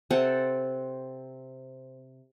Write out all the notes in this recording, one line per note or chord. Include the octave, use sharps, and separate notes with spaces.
C3 C4 A4 F#5